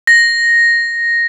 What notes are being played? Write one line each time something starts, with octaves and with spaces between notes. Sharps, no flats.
A#6